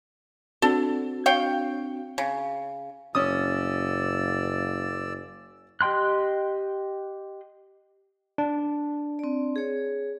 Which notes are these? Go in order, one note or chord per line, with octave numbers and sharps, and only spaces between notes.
C4 D4 F#4 A4
C#5 F5 G5
C#3
F#1 C#4 D5 D#6 E6
G4 D#5 G5 C6 F#6
D4
C4 D5
G#4 C#5